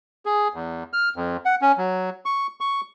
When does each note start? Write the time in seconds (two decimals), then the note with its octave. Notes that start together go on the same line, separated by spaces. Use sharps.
0.25 G#4
0.54 E2
0.93 F6
1.16 F2
1.45 F#5
1.62 C#4
1.77 F#3
2.25 C#6
2.60 C#6